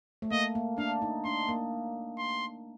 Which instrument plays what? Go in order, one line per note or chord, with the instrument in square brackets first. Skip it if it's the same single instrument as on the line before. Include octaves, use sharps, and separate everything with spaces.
[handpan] A3
[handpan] A#3 [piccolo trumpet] D#5
[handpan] A#3
[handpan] D4 [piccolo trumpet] F5
[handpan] D#4
[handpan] D4 [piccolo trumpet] C6
[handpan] A#3
[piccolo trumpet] C6